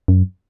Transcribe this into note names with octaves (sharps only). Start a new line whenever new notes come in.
F#2